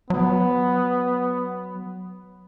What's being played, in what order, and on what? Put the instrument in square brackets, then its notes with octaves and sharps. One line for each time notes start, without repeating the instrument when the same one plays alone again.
[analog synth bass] F#3 [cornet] B3